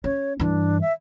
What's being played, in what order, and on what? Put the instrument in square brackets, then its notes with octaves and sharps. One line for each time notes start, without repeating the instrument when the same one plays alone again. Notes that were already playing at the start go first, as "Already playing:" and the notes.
[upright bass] C#4 [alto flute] C#5
[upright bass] G2 E3 [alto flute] D4
[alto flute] E5